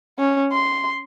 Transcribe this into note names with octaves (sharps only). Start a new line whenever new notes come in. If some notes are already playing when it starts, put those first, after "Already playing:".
C#4
C6